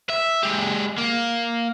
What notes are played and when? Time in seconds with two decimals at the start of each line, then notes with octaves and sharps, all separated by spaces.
0.10 E5
0.43 G#3 G4
0.98 A#3